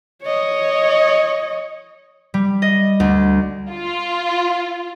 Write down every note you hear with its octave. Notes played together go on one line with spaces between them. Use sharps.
C#5 D#5
G3
D#5
D2
F4